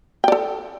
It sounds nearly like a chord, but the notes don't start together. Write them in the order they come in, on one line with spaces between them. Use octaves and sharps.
G5 D5 A4